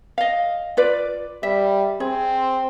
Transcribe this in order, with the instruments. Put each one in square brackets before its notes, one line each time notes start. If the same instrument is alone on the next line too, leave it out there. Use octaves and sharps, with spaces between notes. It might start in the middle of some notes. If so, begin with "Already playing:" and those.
[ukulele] D#5 F5
F4 B4 D5
[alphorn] G3 [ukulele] E5
[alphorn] C4 [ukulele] G#4